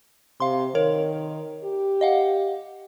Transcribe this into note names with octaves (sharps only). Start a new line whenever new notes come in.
C3 F5 C6
D#3 A#4 C#5
G4
D#5 F5 F#5